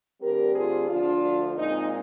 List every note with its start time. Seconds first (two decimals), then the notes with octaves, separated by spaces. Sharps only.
0.21 D2 D3 G3 C4 G4 A#4
0.55 F4 G#4
0.89 D2 D3 F3 D4 F4
1.57 A#2 G#3 C4 D#4